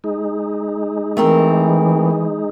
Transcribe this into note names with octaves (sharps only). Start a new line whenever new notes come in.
G#3 D#4
E3 A3 C4 A#4